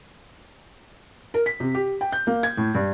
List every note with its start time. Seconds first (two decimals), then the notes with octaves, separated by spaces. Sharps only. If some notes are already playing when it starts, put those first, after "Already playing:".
1.34 A#4
1.46 B6
1.60 C3
1.75 G4
2.01 G5
2.12 G6
2.27 A#3
2.43 G#6
2.57 A2
2.75 G2